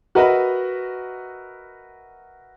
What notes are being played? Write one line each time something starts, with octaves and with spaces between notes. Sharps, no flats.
F#4 A#4 B4 D#5 E5 B5